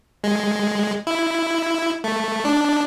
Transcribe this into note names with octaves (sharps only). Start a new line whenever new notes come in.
G#3
E4
A3
D4